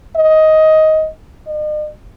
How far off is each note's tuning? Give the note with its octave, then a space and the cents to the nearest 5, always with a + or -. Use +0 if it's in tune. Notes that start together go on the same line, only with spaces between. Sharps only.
D#5 +15
D#5 -45